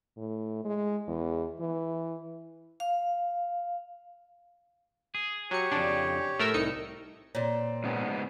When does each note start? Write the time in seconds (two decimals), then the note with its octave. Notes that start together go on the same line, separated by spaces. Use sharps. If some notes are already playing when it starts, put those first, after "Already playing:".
0.17 A2
0.65 G#3
1.08 E2
1.60 E3
2.80 F5
5.15 G#4
5.51 F#3 G4 C#5 C#7
5.71 F2 C#3 D4
6.40 A2 A3 A#4 E6
6.54 C2 D#4 C#7
7.35 A#2 C4 C#5 D5
7.84 G#2 C#3 B3